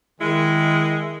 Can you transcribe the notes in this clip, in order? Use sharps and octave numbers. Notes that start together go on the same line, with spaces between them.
D#3 G#3 E4